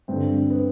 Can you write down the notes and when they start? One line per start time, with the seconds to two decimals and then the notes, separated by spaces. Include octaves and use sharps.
0.08 G2 D3 C4
0.50 B3